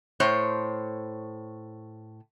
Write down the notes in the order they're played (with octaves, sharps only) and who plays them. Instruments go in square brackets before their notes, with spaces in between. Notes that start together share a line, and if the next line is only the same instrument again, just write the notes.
[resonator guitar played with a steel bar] A2 C5 C#5